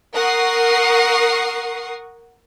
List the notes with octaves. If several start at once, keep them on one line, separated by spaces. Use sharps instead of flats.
A#4 F#5 C#6 D#6 C7